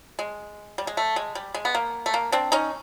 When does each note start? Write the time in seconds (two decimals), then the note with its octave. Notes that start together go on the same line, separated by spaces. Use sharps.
0.19 G#3
0.78 G3
0.87 G#3
0.97 A3
1.16 G#3
1.35 G3
1.54 G#3
1.65 B3
1.75 A#3
2.06 A3
2.14 A#3
2.32 C4 D4
2.52 C#4 D#4